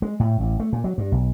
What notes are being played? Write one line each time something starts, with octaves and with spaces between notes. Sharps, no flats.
G#3
A2
A1
A3
A#2
F#3
G2
B1